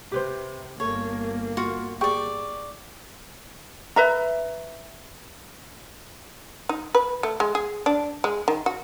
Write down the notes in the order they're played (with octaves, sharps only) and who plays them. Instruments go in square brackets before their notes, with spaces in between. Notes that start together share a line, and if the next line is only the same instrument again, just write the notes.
[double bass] C3 [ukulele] G4 B4 C5
[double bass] G1 A#3 [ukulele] A4 [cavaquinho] C#5
[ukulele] F4 [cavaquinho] F#4
[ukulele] G4 G#4 G5 [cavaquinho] D5 C#6
[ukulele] B4 E5 A#5
[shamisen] D#4
B4
A3
G#3
G#4
D4
G#3
D#3
F#4